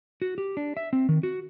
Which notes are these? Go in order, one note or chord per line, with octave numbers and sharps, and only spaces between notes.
F#4
G4
D4
E5
C4
D#3
F#4